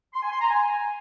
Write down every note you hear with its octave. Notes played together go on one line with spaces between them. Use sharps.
C6
G#5
C6
A#5
G#5